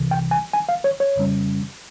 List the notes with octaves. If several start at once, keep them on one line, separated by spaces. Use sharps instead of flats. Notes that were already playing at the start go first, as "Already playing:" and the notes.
Already playing: C2 C3 E3
G5
G#5
G#5
F5
C#5
C#5
F2 C#3 G3 C#4